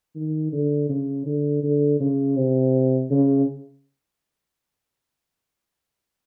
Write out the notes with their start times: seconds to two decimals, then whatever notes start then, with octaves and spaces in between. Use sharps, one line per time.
0.16 D#3
0.53 D3
0.89 C#3
1.27 D3
1.63 D3
2.00 C#3
2.37 C3
3.11 C#3